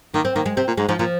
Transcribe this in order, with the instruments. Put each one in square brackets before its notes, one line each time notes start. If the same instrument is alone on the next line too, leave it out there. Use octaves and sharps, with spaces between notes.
[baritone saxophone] D#3 [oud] A#3
[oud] C4
[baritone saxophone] D#3 [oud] A#3
[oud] G#3
[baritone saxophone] C3 [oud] C4
[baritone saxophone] A#2
[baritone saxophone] G#2 [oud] G#3
[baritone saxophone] G#2 [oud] F3
[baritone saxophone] A#2 [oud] F3